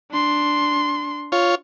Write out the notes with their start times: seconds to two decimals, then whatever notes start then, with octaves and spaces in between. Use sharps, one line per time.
0.11 D4 C6
1.32 F4 C#5